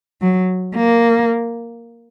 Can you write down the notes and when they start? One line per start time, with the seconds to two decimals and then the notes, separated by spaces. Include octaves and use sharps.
0.22 F#3
0.76 A#3